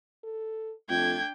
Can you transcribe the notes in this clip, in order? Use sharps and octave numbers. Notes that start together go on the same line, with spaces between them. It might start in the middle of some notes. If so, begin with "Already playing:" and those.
A4
F2 A3 D4 G5 G#6